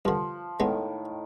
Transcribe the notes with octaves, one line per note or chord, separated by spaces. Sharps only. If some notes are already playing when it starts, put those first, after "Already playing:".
G2 D3 F3
A2 D#3 G#3 B3